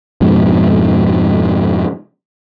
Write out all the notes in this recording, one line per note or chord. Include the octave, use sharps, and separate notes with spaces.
F2 G#2 B2